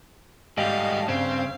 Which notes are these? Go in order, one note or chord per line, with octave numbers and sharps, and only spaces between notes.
G#2 G3 A3 G4 D#5 F5
G2 C#3 C4 F5